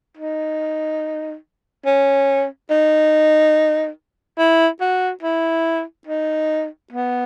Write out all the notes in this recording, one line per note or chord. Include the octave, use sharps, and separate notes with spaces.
D#4
C#4
D#4
E4
F#4
E4
D#4
B3